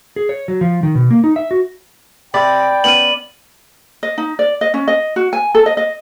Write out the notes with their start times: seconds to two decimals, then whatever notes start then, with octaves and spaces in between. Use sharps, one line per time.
0.16 G#4
0.29 C#5
0.48 F#3
0.61 F3
0.83 D#3
0.95 B2
1.10 A#3
1.24 D#4
1.36 E5
1.51 F#4
2.34 C3 D5 G5 B5
2.84 B3 C#4 D#7 F#7
4.03 D#5
4.18 D#4
4.39 D5
4.61 D#5
4.74 C#4
4.88 D#5
5.16 F#4
5.33 G#5
5.55 A4
5.66 D#5
5.77 D#5